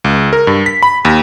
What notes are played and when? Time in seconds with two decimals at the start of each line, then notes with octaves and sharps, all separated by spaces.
0.04 C#2
0.33 A#4
0.47 G2
0.66 B6
0.83 B5
1.05 D#2